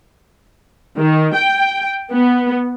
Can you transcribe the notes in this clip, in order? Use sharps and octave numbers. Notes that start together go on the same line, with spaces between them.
D#3
G5
B3